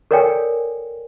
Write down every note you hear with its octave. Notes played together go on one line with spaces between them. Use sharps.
A4 A#4 C#5 D5 G5 G#5